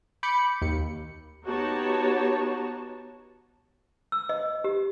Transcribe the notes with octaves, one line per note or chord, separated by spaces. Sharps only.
B5 D6 G6 C#7
D#2 C#7
B3 D#4 F#4 G4 C#5 A5
E6
D#5
G4